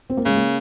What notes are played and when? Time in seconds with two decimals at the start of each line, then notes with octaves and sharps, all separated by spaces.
0.10 C4
0.17 A#3
0.25 C#3 G#3
0.36 A#3